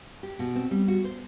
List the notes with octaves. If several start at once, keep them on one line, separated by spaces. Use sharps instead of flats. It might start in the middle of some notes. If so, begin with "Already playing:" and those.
G4
B2
C4
G3
F#4
C5